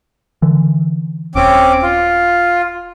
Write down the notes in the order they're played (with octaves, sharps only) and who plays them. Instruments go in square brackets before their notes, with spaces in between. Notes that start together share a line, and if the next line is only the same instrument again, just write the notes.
[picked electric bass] D3 E3
[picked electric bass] D#1 [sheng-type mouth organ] C4 C#4 D6
[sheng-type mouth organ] F4